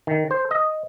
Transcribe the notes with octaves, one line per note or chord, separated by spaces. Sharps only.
D#3
C5
D#5